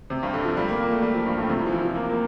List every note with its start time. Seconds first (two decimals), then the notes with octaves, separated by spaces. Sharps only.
0.10 C3
0.23 G2
0.34 D3
0.45 F3
0.57 G3
0.68 A#3
0.80 A#3
0.91 A3
1.02 G3
1.15 F3
1.26 G2
1.38 A2
1.49 C3
1.61 E3
1.66 F3
1.72 E3
1.84 F3
1.95 A#3
2.09 A#3